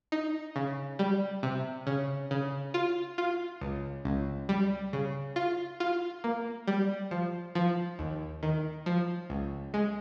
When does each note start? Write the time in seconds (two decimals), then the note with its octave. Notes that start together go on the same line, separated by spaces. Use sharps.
0.12 D#4
0.56 C#3
0.99 G3
1.43 C3
1.87 C#3
2.31 C#3
2.74 F4
3.18 F4
3.61 C#2
4.05 C#2
4.49 G3
4.93 C#3
5.36 F4
5.80 F4
6.24 A#3
6.68 G3
7.11 F3
7.55 F3
7.99 D#2
8.43 D#3
8.86 F3
9.30 C#2
9.74 G#3